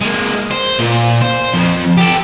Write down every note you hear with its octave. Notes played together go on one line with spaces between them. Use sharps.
G#3 A#3
C5
A#2
C5
F2
G4 A4